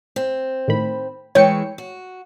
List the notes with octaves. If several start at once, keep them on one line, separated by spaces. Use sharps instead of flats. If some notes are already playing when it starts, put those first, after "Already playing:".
C4
A2 D#3 B5
E3 G#3 C#5 G5 C#7
F#4